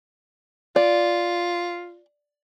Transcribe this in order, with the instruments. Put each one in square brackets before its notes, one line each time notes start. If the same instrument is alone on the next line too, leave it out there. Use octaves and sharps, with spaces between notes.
[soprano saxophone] F4 [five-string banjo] D5